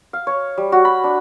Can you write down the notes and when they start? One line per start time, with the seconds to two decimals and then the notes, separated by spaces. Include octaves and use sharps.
0.13 F5
0.27 C#5
0.57 G3
0.72 F#4
0.85 B5
1.04 D4